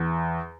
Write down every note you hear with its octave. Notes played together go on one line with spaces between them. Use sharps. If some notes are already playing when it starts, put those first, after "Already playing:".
Already playing: E2